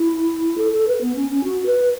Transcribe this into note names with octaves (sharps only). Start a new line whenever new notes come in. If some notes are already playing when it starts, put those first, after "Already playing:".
Already playing: E4
A4
A4
B4
B3
C#4
C#4
F#4
B4